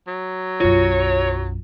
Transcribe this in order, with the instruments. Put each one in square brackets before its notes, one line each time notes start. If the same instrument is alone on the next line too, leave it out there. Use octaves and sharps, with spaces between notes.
[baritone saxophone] F#3
[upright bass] B1 F#2 [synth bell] F4 [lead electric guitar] C#5